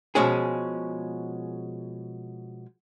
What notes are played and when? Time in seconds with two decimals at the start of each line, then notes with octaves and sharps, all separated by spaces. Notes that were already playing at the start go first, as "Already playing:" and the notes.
0.15 B2 F3 G#3 C#4 G#4